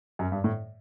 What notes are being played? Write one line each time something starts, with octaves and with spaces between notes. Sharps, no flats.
F#2
G2
A2